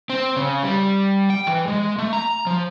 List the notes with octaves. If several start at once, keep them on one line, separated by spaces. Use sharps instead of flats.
C4
C#3
G3
G5
E3
G#3
A3
A#5
F3